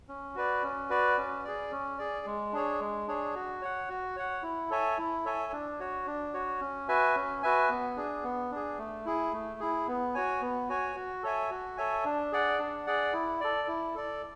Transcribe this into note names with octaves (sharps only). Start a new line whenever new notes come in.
C#4
F#4 B4 D5
C#4
F#4 B4 D5
C#4
G#4 D5
C#4
G#4 D5
G#3
D4 G#4 C#5
G#3
D4 G#4 C#5
F#4
C#5 F#5
F#4
C#5 F#5
E4
A4 C#5 E5 G#5
E4
A4 C#5 E5 G#5
D4
F#4 C#5
D4
F#4 C#5
C#4
F#4 B4 E5 G#5
C#4
F#4 B4 E5 G#5
B3
D4 G#4
B3
D4 G#4
A3
E4 G#4
A3
E4 G#4
B3
F#4 C#5 G#5
B3
F#4 C#5 G#5
F#4
A4 C#5 E5 G#5
F#4
A4 C#5 E5 G#5
D4
G#4 D5 F#5
D4
G#4 D5 F#5
E4
A4 D5
E4
A4 D5